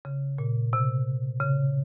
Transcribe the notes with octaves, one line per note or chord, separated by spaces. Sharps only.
C#3
A#2
C3
C#3